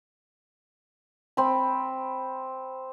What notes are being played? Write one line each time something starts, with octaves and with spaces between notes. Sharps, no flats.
C4 B5